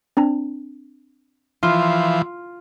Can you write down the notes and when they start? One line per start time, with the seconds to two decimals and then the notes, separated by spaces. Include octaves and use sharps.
0.17 C4 D4 A#5
1.63 E3 F3 F4